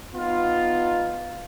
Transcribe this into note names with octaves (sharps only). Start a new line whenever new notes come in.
B3 D#4 F4